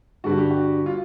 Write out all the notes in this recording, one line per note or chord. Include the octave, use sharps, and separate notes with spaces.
G2 D3 G3 F#4
G4
F#4
F4